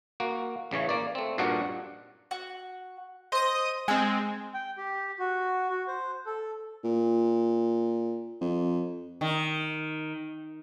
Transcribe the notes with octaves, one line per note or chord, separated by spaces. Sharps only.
A#3 F#4
A1 C#3 E3 C#5
A#3 D5
A3 C4
G2 A#2 D4 D#4 F#4 F#5
F#4
C5 D#5 D#6
G#3 C4 G#4 E6
G5
G4
F#4
F#4
C5
A4
A#2
F2
D#3